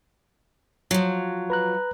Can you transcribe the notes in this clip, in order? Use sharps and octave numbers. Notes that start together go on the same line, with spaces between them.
F3 F#3
B4 A#5 F#6